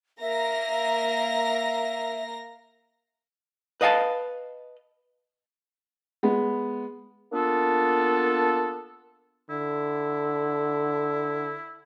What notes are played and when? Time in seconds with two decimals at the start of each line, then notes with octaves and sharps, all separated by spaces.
0.21 A#3 A#4 E5 A#6
3.81 B4 D#5 F5 G#5 A5
6.23 G#3 B3
7.32 A#3 B3 D4 F4 A4
9.50 D3 E4